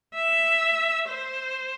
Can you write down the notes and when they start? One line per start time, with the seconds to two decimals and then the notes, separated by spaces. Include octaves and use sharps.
0.14 E5
1.09 C5